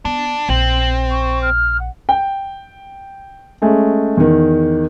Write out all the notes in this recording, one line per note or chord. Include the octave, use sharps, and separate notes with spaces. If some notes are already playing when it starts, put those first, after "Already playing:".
B3 D4
A#1 C4 F#7
C#6
F6
F#5
G5
G#3 A3 C#4
E2 D#3